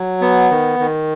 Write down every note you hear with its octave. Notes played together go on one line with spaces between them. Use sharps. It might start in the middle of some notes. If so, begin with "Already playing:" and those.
Already playing: F#3
B3
D#3
D#3